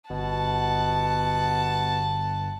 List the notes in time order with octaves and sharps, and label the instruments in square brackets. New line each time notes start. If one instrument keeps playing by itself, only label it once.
[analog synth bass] G1 [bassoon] B2 [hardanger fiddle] F#5 A5